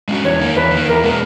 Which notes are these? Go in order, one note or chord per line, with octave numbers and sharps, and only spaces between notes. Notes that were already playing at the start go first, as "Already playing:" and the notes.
G#3 C#4 F#4
E2 C#5
D#3 A#3
E2 B4
D#3
A#3
E2 A#4
B2 G#3 B3